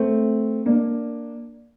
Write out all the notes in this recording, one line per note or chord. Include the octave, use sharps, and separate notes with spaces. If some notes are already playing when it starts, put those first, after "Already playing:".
Already playing: A3 C4
A#3 D4